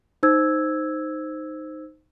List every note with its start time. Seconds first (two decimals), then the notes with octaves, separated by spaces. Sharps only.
0.23 D#4 C5 E6 G#6